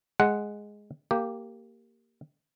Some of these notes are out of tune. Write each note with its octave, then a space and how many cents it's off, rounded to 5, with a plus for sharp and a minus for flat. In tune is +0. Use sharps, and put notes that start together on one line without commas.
G#3 +0 F#5 +0
A#3 -10 G4 +0